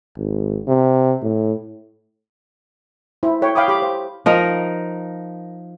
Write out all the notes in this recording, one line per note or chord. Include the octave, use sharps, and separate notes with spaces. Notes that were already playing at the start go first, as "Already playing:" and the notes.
G#1
C3
A2
E4 C5
A4 C#5 G5
F5 G5 B5 D6 D#6
G4 B5 D6
C5 F5 G5
F3 D#4 A#4